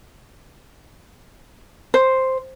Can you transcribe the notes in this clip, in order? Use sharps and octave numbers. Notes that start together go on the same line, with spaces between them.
C5